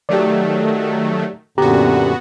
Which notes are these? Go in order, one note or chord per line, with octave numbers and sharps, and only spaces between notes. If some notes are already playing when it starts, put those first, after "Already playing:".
D#3 F#3 A3 G4 D5
F#2 A#2 D3 B3 F#4 G4 A#5